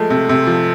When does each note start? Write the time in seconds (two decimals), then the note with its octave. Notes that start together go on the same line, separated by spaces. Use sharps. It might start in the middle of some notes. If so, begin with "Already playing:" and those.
Already playing: F3 G#3 A3
0.10 C3
0.29 C3
0.47 F3